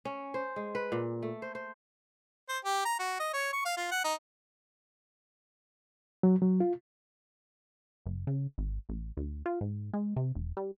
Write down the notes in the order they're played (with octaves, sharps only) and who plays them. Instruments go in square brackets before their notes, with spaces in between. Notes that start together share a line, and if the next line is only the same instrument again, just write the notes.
[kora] C#4
C5
G#3
B4
A#2
A3
C5
C5
[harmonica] C5
G4
A#5
F#4
D#5
C#5
C#6
F5
F4
F#5
D#4
[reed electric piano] F#3
F#3
F4
[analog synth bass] F#1
C#3
G#1
A1
D2
F4
G#2
G#3
C3
E1
G3